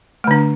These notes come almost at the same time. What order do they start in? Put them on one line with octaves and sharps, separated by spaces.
A3 D3 D4